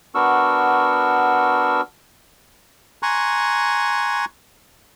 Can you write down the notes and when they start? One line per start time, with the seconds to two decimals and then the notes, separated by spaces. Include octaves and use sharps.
0.15 B3 D4 F#4 A#4 C#6 E6
3.03 G#5 A#5 C6 C#6 F#6